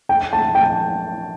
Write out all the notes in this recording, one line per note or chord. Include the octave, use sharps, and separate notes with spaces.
G5
A5
G5